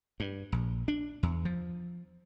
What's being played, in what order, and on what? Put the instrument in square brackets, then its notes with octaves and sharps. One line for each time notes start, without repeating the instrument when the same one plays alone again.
[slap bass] G2
A#1
D4
E2
F3